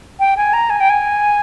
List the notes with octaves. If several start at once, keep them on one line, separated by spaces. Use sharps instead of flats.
G5
G#5
A#5
G#5
G5
G#5